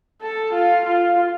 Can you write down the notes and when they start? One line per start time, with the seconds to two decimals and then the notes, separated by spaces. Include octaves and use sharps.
0.22 A4
0.53 F4
0.85 F4